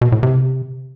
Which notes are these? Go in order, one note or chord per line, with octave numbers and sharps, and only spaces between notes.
B2
A2
C3